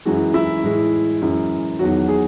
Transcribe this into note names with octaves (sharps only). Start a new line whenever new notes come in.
F#2 E3 G#3 F#4
E4
A2 E3 G#3
F#2 E3 G#3
E2 D#3 F#3 F#4
G#4